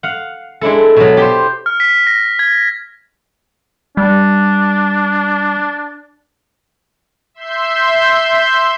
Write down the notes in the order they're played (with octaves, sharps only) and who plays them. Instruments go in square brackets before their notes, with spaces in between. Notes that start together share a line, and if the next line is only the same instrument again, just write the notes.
[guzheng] F5 F#5
G#3 D4 E4 A4
B2 F#3
G4 C5
[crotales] F6
B6
A#6
G#6
[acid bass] G3 [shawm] D4
[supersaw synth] E5 C6 G6